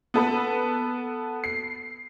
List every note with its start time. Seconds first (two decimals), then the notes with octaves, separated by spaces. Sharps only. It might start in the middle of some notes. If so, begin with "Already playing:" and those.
0.14 B3 A4 B4
1.44 C7